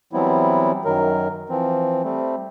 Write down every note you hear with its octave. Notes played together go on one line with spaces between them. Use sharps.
E3 F#3 G3 B3 C4 E4
F#2 D#3 F#3 A#4
E3 F3 C4
G3 A3 C4